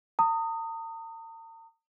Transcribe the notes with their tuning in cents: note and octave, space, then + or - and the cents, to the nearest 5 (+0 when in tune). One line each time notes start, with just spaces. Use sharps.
A#5 -45 D#6 +0